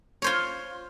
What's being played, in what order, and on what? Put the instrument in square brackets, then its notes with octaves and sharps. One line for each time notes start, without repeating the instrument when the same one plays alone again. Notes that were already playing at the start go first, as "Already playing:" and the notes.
[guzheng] F4 C5 C#5